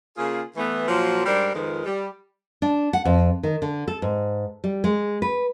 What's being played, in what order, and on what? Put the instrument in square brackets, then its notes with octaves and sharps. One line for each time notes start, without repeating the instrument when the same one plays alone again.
[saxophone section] C#3 A#3 F4 G#4
E3 A3 B3
A#2 F3 F#3 A#3 F4 F#4
G#2 G3 D4 A#4 C5
F2 D#3 F3 G#3 A#4 B4
G3
[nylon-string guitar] D4
F#5
F2
D#3
D3
A4
G#2
G3
G#3
B4